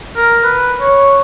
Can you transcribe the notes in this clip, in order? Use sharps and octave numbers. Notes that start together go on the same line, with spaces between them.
A#4
B4
C#5